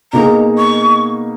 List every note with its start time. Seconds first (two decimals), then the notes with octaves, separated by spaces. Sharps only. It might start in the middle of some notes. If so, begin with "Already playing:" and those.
0.13 B2 A#3 D#4 G#4 A#5
0.58 C#6